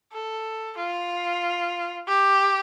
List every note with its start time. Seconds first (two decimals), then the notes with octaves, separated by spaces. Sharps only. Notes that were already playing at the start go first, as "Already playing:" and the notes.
0.13 A4
0.77 F4
2.07 G4